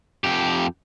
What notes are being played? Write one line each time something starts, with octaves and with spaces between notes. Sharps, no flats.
F2 G4